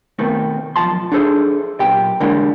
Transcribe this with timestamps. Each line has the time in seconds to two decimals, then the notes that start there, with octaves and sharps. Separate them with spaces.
0.19 B2 D#3 A3 B3 C4
0.76 B1 G2 F3 A5 C6
1.12 D4 D#4 G#4 A4 C5
1.80 B1 A#2 G4 G5
2.20 D3 E3 G3 G#3 A#3 D4